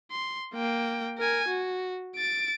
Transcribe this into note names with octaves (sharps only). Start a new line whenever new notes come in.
C6
A#3 G5
A#4 G#5
F#4
A6 D7